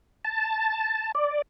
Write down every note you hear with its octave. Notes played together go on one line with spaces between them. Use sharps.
A5
D5